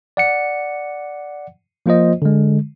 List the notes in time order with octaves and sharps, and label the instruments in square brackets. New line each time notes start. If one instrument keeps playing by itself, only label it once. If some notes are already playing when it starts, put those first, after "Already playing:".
[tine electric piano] D5 F#5 C#7
F3 A#3 F4 C5 D#5
D3 G#3